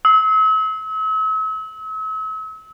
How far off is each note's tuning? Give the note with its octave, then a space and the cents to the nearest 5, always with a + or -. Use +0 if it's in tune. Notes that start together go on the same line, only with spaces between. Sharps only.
E6 -40